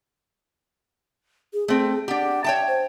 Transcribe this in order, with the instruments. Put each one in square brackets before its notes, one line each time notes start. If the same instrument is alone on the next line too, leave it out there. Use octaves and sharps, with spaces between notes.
[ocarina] G#4
[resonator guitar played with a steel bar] A3 C4 [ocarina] G#4
[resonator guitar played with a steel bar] D4 G4 [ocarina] F#5
[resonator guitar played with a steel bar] C#5 G5 A5 [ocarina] E5
[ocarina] C5